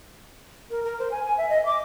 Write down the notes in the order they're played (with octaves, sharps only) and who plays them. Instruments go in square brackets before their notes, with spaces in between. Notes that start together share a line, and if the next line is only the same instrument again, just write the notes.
[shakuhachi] A#4
A#4
C5
G#5
G#5
E5
D#5
D6